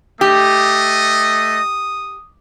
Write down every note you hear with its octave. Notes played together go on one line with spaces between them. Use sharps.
A3 G4 D#5 D#6